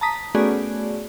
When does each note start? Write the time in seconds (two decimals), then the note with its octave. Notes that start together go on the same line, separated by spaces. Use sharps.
0.01 A5 A#5 D#6 B6
0.35 A3 B3 C#4 F#4 G#4 D5